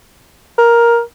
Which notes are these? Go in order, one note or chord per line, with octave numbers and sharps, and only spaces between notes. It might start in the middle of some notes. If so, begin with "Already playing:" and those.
A#4